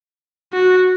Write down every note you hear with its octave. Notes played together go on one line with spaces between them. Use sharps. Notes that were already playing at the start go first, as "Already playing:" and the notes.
F#4